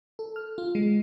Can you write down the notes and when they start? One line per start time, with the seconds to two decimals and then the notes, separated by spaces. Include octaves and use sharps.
0.19 A4
0.36 F6
0.58 F4
0.75 G#3